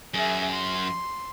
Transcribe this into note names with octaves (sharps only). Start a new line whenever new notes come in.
F#2 G#4 E5
C6